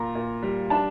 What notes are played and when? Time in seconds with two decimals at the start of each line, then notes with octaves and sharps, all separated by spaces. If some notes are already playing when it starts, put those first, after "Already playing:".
Already playing: A#2 A#5
0.15 A#2
0.42 G3
0.70 D4 A5